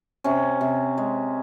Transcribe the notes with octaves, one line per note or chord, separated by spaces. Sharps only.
C3 C#4
C3
G#3